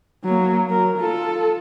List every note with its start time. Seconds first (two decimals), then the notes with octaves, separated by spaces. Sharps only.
0.24 F#3 A#3
0.70 F#3 A#4
0.98 F4 A4